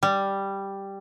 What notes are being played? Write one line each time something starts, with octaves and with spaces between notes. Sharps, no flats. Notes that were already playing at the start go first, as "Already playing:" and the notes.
G3